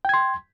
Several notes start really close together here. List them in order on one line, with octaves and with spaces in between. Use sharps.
G5 G#6 C6